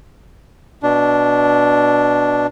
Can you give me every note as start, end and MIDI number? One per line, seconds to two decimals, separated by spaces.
0.83 2.47 47
0.83 2.47 62